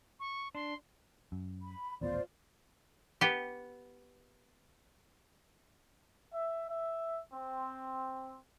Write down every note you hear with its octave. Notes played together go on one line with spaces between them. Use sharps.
C#6
D4 C6
F#2
B5
D#1 A1 B3 F4 C5 D5
B3 G4
E5
E5
C4